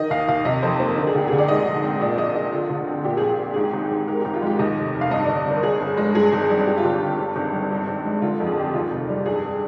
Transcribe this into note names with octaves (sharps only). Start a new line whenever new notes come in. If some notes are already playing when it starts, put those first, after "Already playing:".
Already playing: D#3 D#5
D#2 F5
D#2 F5
C3 D#5
F2 C5
A#3 C5
D3 A#4
G#4
D2 G4
D2 G#4
D5
G#2 D#5
A#1
C4
A#2 D5
A#1 D#5
A#1 D5
D3 F4
D2
C4
A#2 G4
A#1 G#4
G#4
C4 G4
G#2 G#4
G4
G#1
G#1
G#2 A#4
G#1 G4
F4
G#3 G4
D#2 D#5
F1
F1
F5
G2 D#5
G1 D5
G1 A#4
G2 G#4
G1
G#3
G2 G#4
G#1
G3
G2 G4
F4
G1 G4
G1
G2
G#1
G3
G2
G#1
G#3
D3 F4
F2
G#4
C4 G4
D#2 F4
F1
G3
G2 G#4